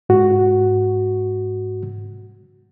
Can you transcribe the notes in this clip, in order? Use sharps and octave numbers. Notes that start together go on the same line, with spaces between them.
G#2 F#4